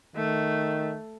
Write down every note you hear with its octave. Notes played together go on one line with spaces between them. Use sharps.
D#3 A3